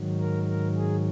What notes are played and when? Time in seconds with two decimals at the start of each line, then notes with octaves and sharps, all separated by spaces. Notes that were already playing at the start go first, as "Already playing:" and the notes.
Already playing: G#2 D#3 F#3
0.20 A#4
0.48 A#4
0.76 G#4